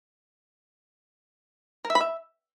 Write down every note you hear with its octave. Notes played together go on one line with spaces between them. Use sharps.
A#4
E5
B5
E5